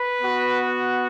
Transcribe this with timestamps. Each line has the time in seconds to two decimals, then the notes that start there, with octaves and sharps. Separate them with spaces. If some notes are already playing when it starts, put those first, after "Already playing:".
Already playing: B4
0.22 B3 F#4